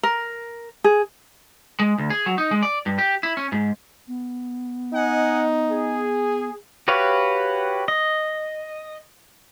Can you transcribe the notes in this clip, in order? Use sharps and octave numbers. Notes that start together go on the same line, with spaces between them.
A#4
G#4
G#3
D2
G#4
F#3
D#4
G#3
D5
G2
G4
E4
C#4
G#2
B3
D#4 D#5 F#5 G#5
G#4
F#4 G4 B4 C#5 F5
D#5